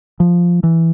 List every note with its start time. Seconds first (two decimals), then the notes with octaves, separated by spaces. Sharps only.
0.20 F3
0.63 E3